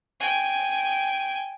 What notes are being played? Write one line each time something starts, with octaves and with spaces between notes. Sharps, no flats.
G5 G#5